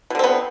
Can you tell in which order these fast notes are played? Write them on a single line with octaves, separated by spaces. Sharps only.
B2 D3 C4 B3